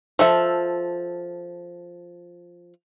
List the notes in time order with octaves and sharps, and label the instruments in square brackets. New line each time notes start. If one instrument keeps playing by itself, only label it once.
[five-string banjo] F3 A4 E5